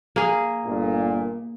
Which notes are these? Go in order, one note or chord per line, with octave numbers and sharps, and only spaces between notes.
A#3 G#4
G1 A#2